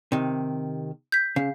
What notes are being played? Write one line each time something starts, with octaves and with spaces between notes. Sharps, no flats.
C3 D#3
G6 B6
C#3 F5